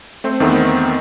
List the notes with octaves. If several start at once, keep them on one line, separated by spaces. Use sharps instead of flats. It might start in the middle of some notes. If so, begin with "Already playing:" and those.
A3 C4 C5
E2 D#3 E3 A3 B3 C4